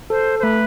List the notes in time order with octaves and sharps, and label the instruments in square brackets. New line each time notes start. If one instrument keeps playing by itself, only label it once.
[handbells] A4 [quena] C5
[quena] C5
[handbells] A3 [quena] B4